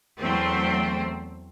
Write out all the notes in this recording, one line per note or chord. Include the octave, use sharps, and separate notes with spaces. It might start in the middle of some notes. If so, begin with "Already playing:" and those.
E2 F#3 A3 C4